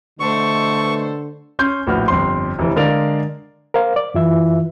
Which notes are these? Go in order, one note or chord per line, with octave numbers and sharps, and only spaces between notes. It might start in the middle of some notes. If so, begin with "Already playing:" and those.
B2 D3 A3 A4 C5 C#6
C#4 C6 G6
A#1 A2 F#4 B4 F6
G1 F2 C6
F1 E3
D3 G#3 A#4 D5 F5 F7
A#4 C5 F5
D5
F#2 E3 F4 E5